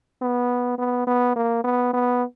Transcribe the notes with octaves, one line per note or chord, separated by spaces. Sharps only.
B3
B3
B3
A#3
B3
B3